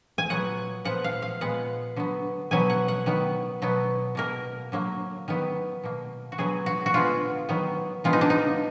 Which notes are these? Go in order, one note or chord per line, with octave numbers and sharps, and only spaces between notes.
G#5
A#2 F#3 B3 F#5
A#2 F3 B3 F#5
F5
F5
A#2 G#3 B3 F#5
D3 F#3 B3
B2 F#3 B3 G#5
F#5
F#5
D#3 F#3 B3
B2 F#3 B3
B2 A#3 A#4
D3 F#3 A#3
D#3 F#3 B3
B2 A#3
F#4
D3 F#3 B3 G#4
F#4
F#4
D3 G#3 B3 F4
D#3 F#3 B3
D3 G#3 B3 F4
D#4
D4
D#4